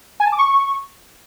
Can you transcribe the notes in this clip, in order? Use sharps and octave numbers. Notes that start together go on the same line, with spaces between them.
G#5
A5
D6
C#6